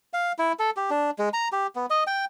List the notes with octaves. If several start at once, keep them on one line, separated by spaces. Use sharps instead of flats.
F5
E4
A4
G4
D4
G#3
A#5
G4
B3
D#5
G5